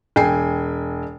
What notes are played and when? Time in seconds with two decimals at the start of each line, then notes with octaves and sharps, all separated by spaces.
0.16 E1 G5 G#5 C7